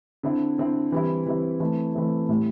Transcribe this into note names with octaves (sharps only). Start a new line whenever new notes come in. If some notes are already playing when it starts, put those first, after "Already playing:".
D3 C4 E4
D3 C4 E4
E3 G3 C4 E4
E3 G3 C4 E4
E3 A3 C4 E4
E3 A3 C4 E4
A2 G3 E4